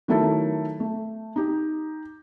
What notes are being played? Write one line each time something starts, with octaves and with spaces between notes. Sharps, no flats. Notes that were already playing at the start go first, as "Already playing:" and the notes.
D#3 F#3 A3 E4 A4 A#4
A3
D#4 G4